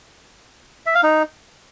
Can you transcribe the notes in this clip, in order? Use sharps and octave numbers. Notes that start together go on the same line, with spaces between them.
E5
F5
D#4